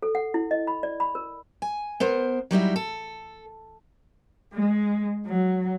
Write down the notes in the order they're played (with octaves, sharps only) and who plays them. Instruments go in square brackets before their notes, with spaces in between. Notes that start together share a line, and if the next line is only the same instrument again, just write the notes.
[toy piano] A4
F#5
E4
D#5
B5
D5
B5
A#4
[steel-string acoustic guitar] G#5
B3 A#4 C5
F#3 G3 D#4 E4
A4
[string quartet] G#3
F#3